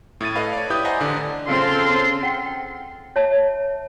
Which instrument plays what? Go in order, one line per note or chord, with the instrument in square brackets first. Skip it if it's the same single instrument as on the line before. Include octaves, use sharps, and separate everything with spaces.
[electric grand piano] A2 E4 A6 D#7
A4 B4 D#5 F5 B5
C#5 D5
E4 G4 B4 D#6 G6
C5 D#5 F#5 G#5 A#5
A1 D3 D4
[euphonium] C#3 [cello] C4 [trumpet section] F4 A4 [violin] C6
[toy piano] F#5 G5
G5
C#5 E5 A5